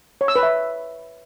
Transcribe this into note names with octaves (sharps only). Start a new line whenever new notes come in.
C#5
E6
B4
E5